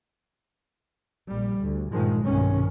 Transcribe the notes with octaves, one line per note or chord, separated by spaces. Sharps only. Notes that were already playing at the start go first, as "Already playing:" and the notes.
A#1 G3
D2
G2 A#2 D#3 F3 G#3
B1 G2 C3 D#3 C#4